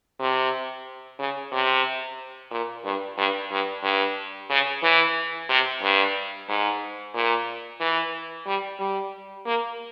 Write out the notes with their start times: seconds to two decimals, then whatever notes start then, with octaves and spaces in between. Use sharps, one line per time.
0.20 C3
1.19 C#3
1.52 C3
2.51 A#2
2.84 G2
3.17 G2
3.51 G2
3.83 G2
4.50 C#3
4.83 E3
5.49 C3
5.82 G2
6.49 G#2
7.14 A#2
7.80 E3
8.46 G3
8.79 G3
9.46 A#3